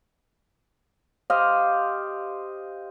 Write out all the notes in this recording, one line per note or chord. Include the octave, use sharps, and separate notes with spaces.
G4 C5 D#5 F5